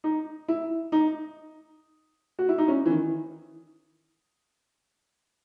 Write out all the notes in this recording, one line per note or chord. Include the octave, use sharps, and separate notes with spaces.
D#4
E4
D#4
F#4
E4
D#4
C#4
E3
D#3